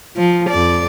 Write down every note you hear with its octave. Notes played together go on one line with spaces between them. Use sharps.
F3
F2 D5